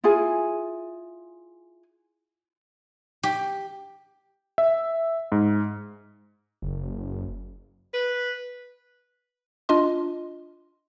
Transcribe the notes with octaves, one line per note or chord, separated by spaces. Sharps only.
E4 F4 G#4 G#5
G4
E5
G#2
F#1
B4
D4 F4 D#5 C6